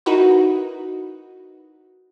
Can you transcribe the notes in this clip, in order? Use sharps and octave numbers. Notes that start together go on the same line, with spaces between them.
D#4 E4 F#4 A#4 B4